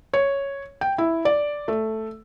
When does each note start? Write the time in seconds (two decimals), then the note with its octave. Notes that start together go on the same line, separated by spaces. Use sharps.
0.14 C#5
0.81 G5
0.98 E4
1.25 D5
1.68 A3